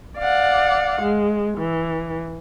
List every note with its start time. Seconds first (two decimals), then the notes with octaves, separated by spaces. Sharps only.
0.18 D5 F5 F#5
1.02 G#3
1.58 E3